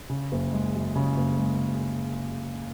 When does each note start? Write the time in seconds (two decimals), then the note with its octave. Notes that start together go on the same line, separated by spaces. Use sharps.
0.10 C#3
0.32 F#1
0.53 G#3
0.75 F#2
0.96 C#3
1.17 F#1
1.38 G#3